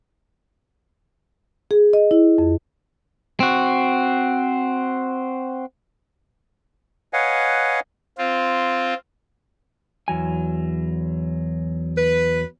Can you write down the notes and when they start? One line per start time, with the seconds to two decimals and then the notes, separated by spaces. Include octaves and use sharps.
1.71 G#4
1.93 D#5
2.11 E4
2.38 F2
3.40 C4 F#4
7.13 B4 C#5 D#5 F5 F#5 G#5
8.18 C4 F4
10.08 E2 F#3 G#5
11.96 B4